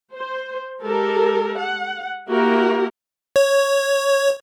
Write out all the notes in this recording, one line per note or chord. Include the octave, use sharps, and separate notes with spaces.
C5
G#3 G4 A4 A#4
F#5
A#3 E4 F#4 G4 A#4
C#5